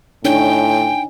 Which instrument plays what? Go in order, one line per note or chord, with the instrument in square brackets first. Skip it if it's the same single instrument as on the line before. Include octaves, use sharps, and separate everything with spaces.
[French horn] A2 [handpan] D4 D#4 C#5 [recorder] G5 [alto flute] G#5